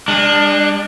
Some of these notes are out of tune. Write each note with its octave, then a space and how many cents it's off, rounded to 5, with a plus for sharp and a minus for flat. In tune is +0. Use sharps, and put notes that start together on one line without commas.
G#3 -45 D4 +10